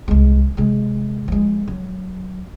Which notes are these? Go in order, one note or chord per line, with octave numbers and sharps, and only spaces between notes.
C2 G#3
C3 G#3
F3 G#3
F#3